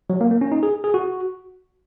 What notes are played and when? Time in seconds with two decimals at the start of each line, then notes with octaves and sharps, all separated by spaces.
0.10 F#3
0.21 A#3
0.31 A#3
0.41 C#4
0.52 D#4
0.63 G#4
0.84 G#4
0.94 F#4